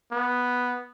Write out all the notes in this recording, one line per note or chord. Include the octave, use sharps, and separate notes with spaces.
B3